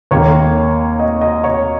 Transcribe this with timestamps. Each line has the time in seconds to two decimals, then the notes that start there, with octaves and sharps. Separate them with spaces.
0.11 D#2 D#3 A#3 C#5
0.99 D#5
1.21 D#5
1.44 C#5